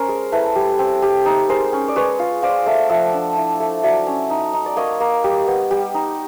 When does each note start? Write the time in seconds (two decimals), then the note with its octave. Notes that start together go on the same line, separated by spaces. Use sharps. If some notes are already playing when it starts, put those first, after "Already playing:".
Already playing: C#4 A#4 C5
0.08 G#3
0.32 E4 A4 B4
0.55 G3
0.79 C4
1.02 G3
1.25 D#4
1.49 G#3 A#4 C5
1.73 C#4
1.88 D5
1.96 G#3 B4 C#5
2.19 F4
2.42 F4 C5 D5
2.66 A3 D5 E5
2.89 F3 E5 F#5
3.13 D4
3.37 E4
3.60 A3
3.83 F#3 D5 E5
4.07 C#4
4.30 D#4
4.53 D#4
4.66 D5
4.76 A#3 C#5 D#5
5.00 A#3
5.24 G3
5.47 B3
5.71 G3
5.94 D#4